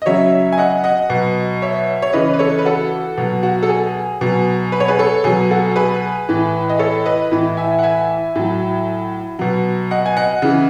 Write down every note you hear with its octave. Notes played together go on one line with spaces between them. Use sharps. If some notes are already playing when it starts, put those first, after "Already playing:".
D#5
C#3 F#3 C#5 E5
G#5
D#5 F#5
D#5 F#5
B2 F#3
C#5 E5
C#5
C#3 E3 B4 D#5
B4
A4 C#5
B4
F#4 A4
B2 F#3
F#4
A4
G#4
B2 F#3
B4
C#5
G#4 B4
A4 C#5
B2 F#3 G#4
F#4 A4
G#4 B4
A2 E3
D#5
A4 C#5
B4 D#5
A2 E3
E5 G#5
F#5
E5 G#5
A2 F#3
B2 F#3
D#5 F#5
G#5
D#5 F#5
C#3 E3